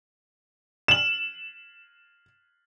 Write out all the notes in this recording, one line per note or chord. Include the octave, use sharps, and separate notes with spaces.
E7 F#7